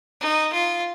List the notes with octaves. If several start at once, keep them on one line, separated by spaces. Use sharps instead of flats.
D#4
F4